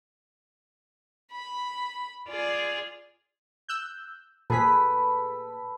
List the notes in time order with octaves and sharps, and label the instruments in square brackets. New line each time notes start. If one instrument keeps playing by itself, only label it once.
[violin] B5
[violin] F4 G#4 [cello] D5
[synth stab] E6 F#6 G6
[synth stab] A#2 G#4 B6 [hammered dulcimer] A4 B4